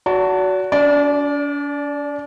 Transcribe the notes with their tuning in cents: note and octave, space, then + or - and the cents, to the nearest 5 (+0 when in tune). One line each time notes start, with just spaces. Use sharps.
F#4 +0 D5 -45 A5 +20
D4 -45 D5 -10